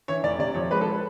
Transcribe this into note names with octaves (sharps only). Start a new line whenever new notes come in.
E3 C#5
F1 D5
C3 D5
F3 C#5
G#3 B4
A4
B4